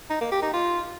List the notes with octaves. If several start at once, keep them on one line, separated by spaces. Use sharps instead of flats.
D#4
A#3
G4
D#4
F4